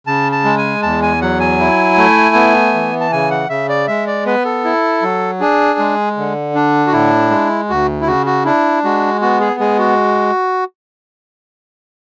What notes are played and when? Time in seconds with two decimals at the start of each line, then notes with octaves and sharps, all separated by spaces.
0.07 C#3 A5
0.32 A5
0.45 G#3
0.58 G#5
0.82 E2 A5
1.03 G#5
1.21 F#3 F#5
1.40 G#5
1.59 E4
1.97 A3
2.35 B3
2.74 E3
3.01 A5
3.12 C#3 G#5
3.31 F#5
3.49 C#3 E5
3.69 D5
3.87 G#3 E5
4.07 D5
4.26 B3 B4
4.45 A4
4.64 E4
5.02 F#3
5.40 D4 G#4
5.79 G#3
6.17 D3
6.55 D4
6.87 F#4
6.92 A2 E4
7.31 G#3
7.69 D2 F#4
8.01 E4
8.07 C#3 F#4
8.26 F#4
8.45 D4 E4
8.84 G#3 F#4
9.21 B3 F#4
9.40 G#4
9.60 G#3 G#4
9.79 F#4